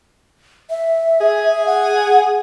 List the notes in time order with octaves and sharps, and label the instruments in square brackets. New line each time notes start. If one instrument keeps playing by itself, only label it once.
[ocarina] E5
[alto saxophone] G#4
[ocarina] F#5